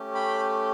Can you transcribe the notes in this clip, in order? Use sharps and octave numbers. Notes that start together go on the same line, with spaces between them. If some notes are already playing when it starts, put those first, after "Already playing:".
Already playing: A3 C#4 G4
G5 B5